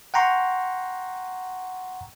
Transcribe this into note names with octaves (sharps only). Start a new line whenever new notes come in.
F#5 G5 A#5 C6 C#6